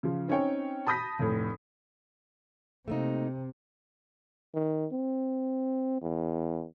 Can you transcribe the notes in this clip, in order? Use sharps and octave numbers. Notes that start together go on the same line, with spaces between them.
C#3 F3
C4 C#4 D#4 C#5 G5
A5 B5 D#6 G6 A#6 B6
F1 A2
C3 A3 A#3 D#4
D#3
C4
E2